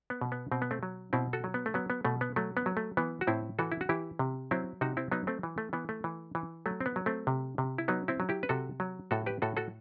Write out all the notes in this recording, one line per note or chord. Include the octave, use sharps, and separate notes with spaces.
B3
B2
B3
B2 C4
B3
A3 C4
F#3
B2 C4 E4
F#4 A4
F#3
B3
A3
F#3 B3
B3
B2 A3
B3
F#3 A3
B3
F#3
A3
E3 B3
F#4
A2 C4 E4
E3 F#4 A4
E4
F#4
E3 E4 G4
C3
F#3 C4 E4
C3 D#4 F#4
C4 E4
F#3 B3 D#4
A3 C4
E3
A3
E3 B3
A3
E3
E3
F#3 A3
C4
B3
F#3
A3 C4
C3
C3
E4
F#3 B3 D#4
C4 E4
F#3
E4 G4
B4
C3 F#4 A4
F#3
A2 F#4 A4
G4 B4
A2 F#4 A4
F#4 A4